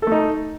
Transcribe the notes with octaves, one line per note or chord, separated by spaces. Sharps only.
A3 D#4 A4